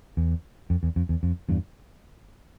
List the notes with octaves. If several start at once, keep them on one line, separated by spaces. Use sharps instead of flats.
E2
F2
E2
F2
E2
F2
E2 G2